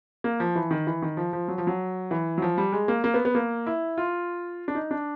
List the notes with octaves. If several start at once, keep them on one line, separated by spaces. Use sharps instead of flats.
A#3
F3
E3
D#3
E3
D#3
F3
F3
F#3
F3
F#3
E3
F#3
F3
G3
G#3
A#3
A#3
B3
B3
A#3
E4
F4
D4
D#4
D4